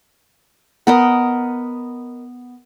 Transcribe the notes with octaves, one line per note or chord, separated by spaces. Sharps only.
B3 A#4 D#5